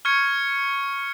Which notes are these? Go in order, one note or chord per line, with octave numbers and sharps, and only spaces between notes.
C#6 F6 G#6 C#7